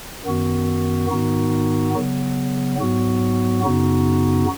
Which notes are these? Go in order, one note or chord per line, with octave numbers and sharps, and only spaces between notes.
F#2 D#3 B3 F#4
G#2 D#3 B3 D#4 F#4
C#3 F#3 B3
G#2 F#3 B3 F#4
F#2 C#3 B3 D#4 F#4